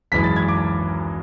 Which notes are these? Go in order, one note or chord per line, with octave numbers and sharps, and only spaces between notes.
G#1 F#2 E3 G#3 B6
A6
G#6
D6